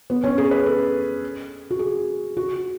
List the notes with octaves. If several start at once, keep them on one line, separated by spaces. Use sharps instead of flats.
B3
C#4
G#4
B4
A4
F#4
G#4
F#4